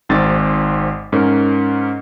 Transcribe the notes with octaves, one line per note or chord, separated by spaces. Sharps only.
G#1 G#2 C4 A6
G#2 C#4 A#4